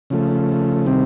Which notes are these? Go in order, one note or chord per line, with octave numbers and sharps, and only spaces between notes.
C#3 F3 A3
C3 D#3 G3 C4